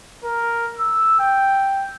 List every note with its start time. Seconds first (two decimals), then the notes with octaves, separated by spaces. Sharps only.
0.24 A#4
0.78 E6
1.20 G5